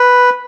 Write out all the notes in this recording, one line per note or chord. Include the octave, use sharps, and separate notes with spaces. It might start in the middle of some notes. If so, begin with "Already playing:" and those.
Already playing: B4